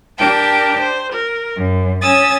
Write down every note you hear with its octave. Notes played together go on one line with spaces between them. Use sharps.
D4 G4 A#4 G5 A5
C5
A#4
F#2
C#4 G#5 D#6 E6 A6